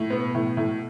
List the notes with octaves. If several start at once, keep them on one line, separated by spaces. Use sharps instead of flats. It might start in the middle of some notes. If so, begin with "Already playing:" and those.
Already playing: A2
B2 B3
A2
A2